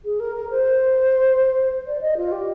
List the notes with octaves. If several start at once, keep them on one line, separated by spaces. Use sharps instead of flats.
G#4
A#4
A#4
C5
D5
D#5
F4
G4